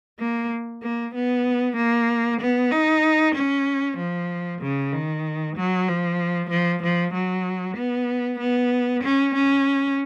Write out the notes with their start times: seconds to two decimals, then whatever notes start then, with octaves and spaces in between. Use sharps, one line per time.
0.20 A#3
0.83 A#3
1.15 B3
1.77 A#3
2.41 B3
2.72 D#4
3.35 C#4
3.98 F3
4.61 C#3
4.93 D#3
5.57 F#3
5.88 F3
6.50 F3
6.83 F3
7.14 F#3
7.77 B3
8.40 B3
9.04 C#4
9.35 C#4